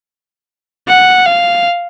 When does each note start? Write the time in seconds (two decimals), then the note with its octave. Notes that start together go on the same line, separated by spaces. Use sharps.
0.88 F#5
1.26 F5